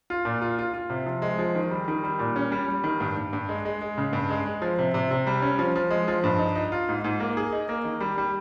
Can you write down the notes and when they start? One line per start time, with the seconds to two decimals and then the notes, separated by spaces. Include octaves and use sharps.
0.10 F4
0.25 A#2
0.42 F4
0.59 F4
0.73 F4
0.90 C3
1.06 F3
1.22 G#3
1.39 F3
1.55 D#3
1.71 G3
1.88 D#3
2.04 G3
2.19 A#2
2.36 C#4
2.52 G3
2.68 G3
2.84 D#3
3.00 G2
3.17 G2
3.33 G2
3.49 G#3
3.65 G#3
3.81 G#3
3.98 C#3
4.13 G2
4.30 G#3
4.46 G#3
4.62 F3
4.78 C3
4.94 C3
5.11 C3
5.27 G3
5.42 C#4
5.59 F3
5.75 F3
5.91 G#3
6.08 F3
6.24 G2
6.39 D#4
6.56 D#4
6.72 F4
6.89 G#2
7.04 G#2
7.20 A#3
7.37 G#4
7.52 D#4
7.69 A#3
7.85 D#3
8.00 G3
8.18 G3